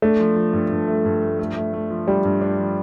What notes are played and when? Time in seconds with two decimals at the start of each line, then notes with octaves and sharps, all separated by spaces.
0.02 A3 D4
0.20 F3
0.36 F3
0.53 G2
0.71 G2
0.88 A3
1.05 G2
1.22 A3
1.39 A3
1.56 A3
1.74 A3
1.90 F3
2.07 G3 D4
2.24 G2
2.41 D4
2.58 F3